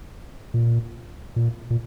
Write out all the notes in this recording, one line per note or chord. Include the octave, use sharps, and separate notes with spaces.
A#2
A#2
A#2